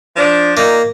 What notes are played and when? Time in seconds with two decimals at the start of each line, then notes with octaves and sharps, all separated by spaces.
0.16 F3 D4
0.57 A#2 A#3 D#4